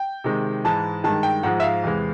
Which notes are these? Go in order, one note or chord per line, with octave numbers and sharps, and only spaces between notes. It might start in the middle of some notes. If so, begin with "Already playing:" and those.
Already playing: G5
C3 D#3 G#3
G#2 E3 G#3 A5
G2 D#3 G#3 A5
G5
G#2 F3 G#3 F#5
E5
F5
E2 C3 E3 G#3